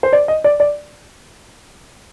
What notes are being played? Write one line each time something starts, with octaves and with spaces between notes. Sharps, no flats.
C5
D5
D#5
D5
D5